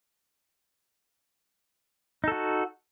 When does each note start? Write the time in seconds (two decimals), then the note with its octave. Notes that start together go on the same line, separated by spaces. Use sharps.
2.24 D#4
2.28 A4
2.32 F#4